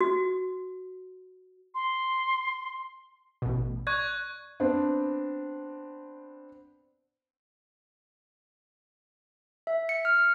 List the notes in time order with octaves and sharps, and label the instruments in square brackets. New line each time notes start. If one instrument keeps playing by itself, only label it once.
[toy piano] F#4
[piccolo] C6
[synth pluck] A1 B2
[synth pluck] D5 [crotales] C#6 F#6 G#6
[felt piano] B3 C4 D4
[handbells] E5
C#7
F6